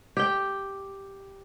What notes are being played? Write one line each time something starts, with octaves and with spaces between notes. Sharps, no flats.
G4 G5